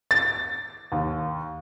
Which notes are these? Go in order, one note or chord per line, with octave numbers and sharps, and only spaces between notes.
A6
D#2